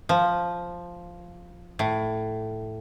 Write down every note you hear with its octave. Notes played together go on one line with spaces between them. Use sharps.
F3
A2